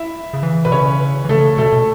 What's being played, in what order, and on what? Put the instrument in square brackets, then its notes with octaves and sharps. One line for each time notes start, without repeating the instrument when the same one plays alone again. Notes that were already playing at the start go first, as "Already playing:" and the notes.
Already playing: [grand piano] E4 E5
[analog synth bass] C#3
E3
[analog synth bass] B2 [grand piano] B4
[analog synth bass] C#3 [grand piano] C#4 C#5
[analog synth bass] E3
[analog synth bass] C#3 [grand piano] A3 A4
[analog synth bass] B2 [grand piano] A3 A4
[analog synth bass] B2